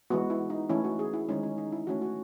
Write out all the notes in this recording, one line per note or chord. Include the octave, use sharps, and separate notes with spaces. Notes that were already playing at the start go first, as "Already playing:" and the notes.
E3 G#3 B3 F#4
E4
D#4
E3 A3 C#4 E4
F#4
G#4
E4
D#3 G#3 C#4 D#4
C#4
D#4
E4
E3 A3 C#4 F#4
F#4